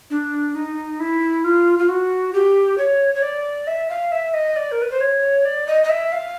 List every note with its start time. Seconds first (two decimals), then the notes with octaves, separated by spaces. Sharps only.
0.10 D4
0.55 D#4
1.00 E4
1.44 F4
1.79 F4
1.88 F#4
2.33 G4
2.78 C#5
3.15 C#5
3.22 D5
3.67 E5
3.89 F5
4.12 E5
4.34 D#5
4.56 D5
4.72 A#4
4.82 B4
4.91 C5
5.01 C#5
5.45 D5
5.67 D#5
5.84 D#5
5.90 E5
6.12 F5